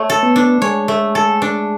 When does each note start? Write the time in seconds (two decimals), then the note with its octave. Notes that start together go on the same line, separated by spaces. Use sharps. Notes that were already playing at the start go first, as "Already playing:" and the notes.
Already playing: A3 C#5
0.10 A4
0.23 B3
0.36 D4
0.62 G#3 C#5
0.88 A3
1.15 A4
1.42 D4